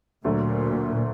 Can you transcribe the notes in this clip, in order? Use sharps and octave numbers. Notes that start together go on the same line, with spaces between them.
D2 A#2 D3 F#3 A3